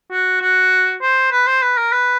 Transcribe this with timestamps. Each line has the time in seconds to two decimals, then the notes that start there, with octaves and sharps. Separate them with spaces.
0.11 F#4
0.41 F#4
1.02 C5
1.32 B4
1.47 C5
1.62 B4
1.77 A#4
1.92 B4